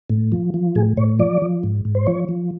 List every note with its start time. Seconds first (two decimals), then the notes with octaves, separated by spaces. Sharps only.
0.10 A2
0.32 F3
0.54 F3
0.75 A2 G#4
0.97 A2 C#5
1.19 F3 D5
1.42 F3
1.63 G#2
1.85 G#2
1.95 C5
2.07 F3 C#5
2.29 F3